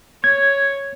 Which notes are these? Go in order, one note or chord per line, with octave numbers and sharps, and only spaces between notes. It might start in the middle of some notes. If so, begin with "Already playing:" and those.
C#5 G#6